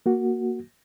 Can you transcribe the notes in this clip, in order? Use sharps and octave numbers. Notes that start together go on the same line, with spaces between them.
A#3 F#4